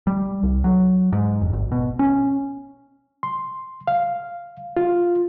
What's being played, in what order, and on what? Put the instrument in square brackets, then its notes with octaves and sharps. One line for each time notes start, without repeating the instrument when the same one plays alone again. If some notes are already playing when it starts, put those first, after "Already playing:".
[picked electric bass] G3
C2
F#3
G#2
F1
G#1
B2
C#4
[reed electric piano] C6
F5
F4